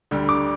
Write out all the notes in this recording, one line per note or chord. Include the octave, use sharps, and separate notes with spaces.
D2 D3 G3
D6